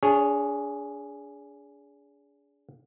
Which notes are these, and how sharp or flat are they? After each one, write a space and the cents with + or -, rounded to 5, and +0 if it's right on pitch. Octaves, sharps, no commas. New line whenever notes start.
D4 -35 G#4 +0 C#5 +0